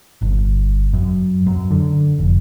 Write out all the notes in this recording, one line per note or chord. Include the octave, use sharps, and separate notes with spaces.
G1
F#2
F#2
D3
F1